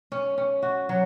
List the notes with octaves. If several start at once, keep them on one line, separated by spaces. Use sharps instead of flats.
C#4
C#4
F#4
F#3